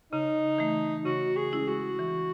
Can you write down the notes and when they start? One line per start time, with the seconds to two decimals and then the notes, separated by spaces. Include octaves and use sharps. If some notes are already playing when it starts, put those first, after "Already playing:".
0.12 C#3 D#4
0.58 E3 A3
1.05 C#3 F#4
1.36 G#4
1.52 G#3 C#4 E4
1.67 F#4
1.99 E3